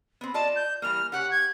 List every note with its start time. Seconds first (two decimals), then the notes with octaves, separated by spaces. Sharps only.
0.21 B3 C4
0.34 F4 D5 D#5 A5
0.56 G6
0.82 E3 G3 A#3 F6
1.12 C#3 G4 C#5 F#5
1.31 G#6